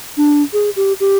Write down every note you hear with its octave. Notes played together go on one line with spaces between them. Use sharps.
D4
G#4
G4
G4